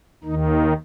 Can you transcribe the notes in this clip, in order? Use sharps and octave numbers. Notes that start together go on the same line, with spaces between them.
D#2 D#3 D#4